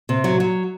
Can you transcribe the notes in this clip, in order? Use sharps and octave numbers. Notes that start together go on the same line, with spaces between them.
C3
F#3
F#3